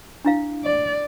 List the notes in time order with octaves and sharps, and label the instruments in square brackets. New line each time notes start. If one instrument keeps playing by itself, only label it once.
[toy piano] D4 E4 F5
[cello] D5